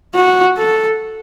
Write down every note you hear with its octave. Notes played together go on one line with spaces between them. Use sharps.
F#4
A4